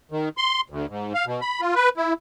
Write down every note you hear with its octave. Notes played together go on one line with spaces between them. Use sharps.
D#3
C6
D2
G#2
F5
B2
B5
F4
B4
E4